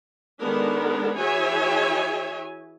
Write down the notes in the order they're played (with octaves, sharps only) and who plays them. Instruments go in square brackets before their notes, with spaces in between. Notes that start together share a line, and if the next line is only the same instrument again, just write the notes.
[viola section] D#3 G#3 B3 D4 A4 A#4
E3 F#4 G#4 C#5 E5 G#5